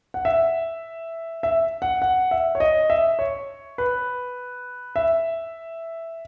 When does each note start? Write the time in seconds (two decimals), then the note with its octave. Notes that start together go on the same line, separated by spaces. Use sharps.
0.14 F#5
0.25 E5
1.43 E5
1.82 F#5
2.02 F#5
2.31 E5
2.55 C#5
2.60 D#5
2.90 E5
3.19 C#5
3.78 B4
4.96 E5